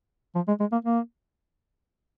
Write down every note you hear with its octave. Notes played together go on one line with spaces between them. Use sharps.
F3
G#3
G#3
A#3
A#3